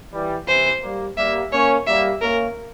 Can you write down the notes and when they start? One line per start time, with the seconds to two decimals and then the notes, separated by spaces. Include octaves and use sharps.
0.12 E3 G3
0.47 C3 E3 C5
0.82 G3 A#3
1.17 G3 A#3 E5
1.52 A#3 C#4 C#5
1.87 G3 A#3 E5
2.21 A#3 C#4 A#4